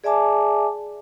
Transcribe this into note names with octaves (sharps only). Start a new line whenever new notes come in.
G#4 D5 E5 G#5 A5 D6